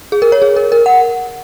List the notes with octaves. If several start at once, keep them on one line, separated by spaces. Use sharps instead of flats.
G#4
A#4
C#5
G#4
A#4
A#4
F#5